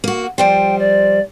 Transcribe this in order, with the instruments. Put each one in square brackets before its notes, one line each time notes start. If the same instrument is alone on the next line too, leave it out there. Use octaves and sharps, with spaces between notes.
[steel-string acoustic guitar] A#3 F#4
[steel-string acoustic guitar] F3 G3 C5 [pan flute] G5
[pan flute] D5